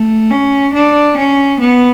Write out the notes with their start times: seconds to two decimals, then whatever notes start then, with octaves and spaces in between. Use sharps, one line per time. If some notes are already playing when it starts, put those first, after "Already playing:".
Already playing: A3
0.31 C#4
0.73 D4
1.17 C#4
1.60 B3